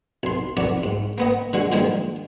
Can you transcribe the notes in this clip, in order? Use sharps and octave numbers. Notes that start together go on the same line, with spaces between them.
B1 C6
B1 F2 F#3 D5
G#2
A#3 B3 D#5
D3 F#3 G#3
A#2 D3 D#3 F3 G#3